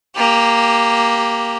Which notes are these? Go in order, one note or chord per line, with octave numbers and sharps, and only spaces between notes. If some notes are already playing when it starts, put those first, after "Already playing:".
A#3 G4